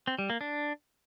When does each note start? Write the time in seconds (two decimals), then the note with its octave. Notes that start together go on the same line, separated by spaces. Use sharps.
0.07 C4
0.19 G3
0.30 A#3
0.41 D4